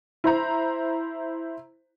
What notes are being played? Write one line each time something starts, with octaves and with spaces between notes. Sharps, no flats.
E4 C5 A#5